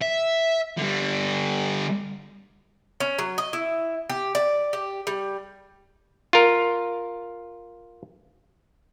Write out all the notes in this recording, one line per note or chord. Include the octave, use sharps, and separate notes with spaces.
E5
D3 G3
C#4
F#3
D#5
E4
G4
D5
G4
G3
F4 A#4